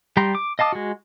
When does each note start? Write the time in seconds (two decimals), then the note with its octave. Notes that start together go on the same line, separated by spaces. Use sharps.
0.17 G3 G5 A#5 C6
0.35 D6
0.59 D#5 F5 A5 D6 D#6
0.72 G#3 F#4